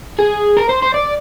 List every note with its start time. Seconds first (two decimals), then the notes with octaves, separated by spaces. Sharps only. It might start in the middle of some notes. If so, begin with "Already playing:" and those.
0.19 G#4
0.57 A#4
0.69 C5
0.82 C5
0.94 D5